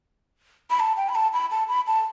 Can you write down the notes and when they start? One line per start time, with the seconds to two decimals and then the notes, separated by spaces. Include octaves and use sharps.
0.70 B5
0.80 A5
0.97 G5
1.09 B5
1.15 A5
1.33 B5
1.51 A5
1.68 B5
1.87 A5